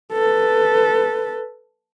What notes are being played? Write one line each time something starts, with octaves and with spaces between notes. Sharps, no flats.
A4 B4